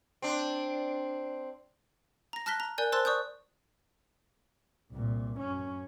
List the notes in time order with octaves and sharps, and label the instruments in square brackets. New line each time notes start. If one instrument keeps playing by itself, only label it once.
[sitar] C4 D4
[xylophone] A#5 A#6
A5 F6 F#6 A#6 B6 G7
A#5
A#4 D5 G#5 F#6 G6
C5 A5 C6 E6 F#6 A6
D5 C#6 D#6 F#6 G6
[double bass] C2 A#2
F#2 C#4